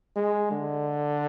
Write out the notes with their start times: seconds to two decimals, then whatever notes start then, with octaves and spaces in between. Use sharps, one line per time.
0.16 G#3
0.51 D3